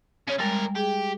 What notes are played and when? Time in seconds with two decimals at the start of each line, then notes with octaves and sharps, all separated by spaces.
0.28 C#3 C#4
0.39 G#2 G3 G#3 A#4 A6
0.76 G4 G#4